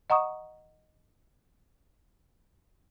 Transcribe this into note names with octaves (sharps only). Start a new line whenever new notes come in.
D#5 F#5 A#5 C#6 D#6